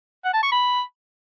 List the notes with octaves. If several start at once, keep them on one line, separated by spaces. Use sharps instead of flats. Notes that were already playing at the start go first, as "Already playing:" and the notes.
F#5
A5
C#6
B5